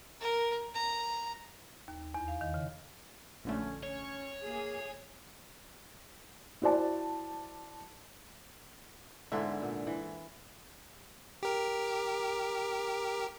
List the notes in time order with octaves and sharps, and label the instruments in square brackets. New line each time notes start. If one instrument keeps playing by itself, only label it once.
[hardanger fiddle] A#4
A#5
[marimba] D#2
E2
F5
D#3
C#3
[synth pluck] A#1 D3 A3 [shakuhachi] C#4
[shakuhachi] C#4 [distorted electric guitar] C#5
[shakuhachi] A#3 [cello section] G#4
[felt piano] E4 F#4 C5 D5 A5
[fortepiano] G#2 E5 [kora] D3 B3 E4
[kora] A#2
E3
[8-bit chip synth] G4 A#4